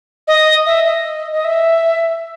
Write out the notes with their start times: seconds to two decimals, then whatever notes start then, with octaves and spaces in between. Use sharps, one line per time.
0.28 D#5
0.66 E5
0.86 D#5
1.33 D#5
1.45 E5